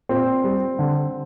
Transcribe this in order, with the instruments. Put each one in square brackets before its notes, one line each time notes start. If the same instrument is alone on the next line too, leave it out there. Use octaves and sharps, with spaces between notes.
[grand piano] A#2 C4
G3
D3